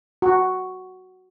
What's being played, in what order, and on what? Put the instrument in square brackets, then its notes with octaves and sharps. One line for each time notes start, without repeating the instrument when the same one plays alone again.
[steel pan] F#4